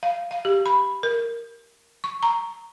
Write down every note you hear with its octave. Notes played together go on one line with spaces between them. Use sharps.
F5
F5
G4
B5
A#4
C#6
A#5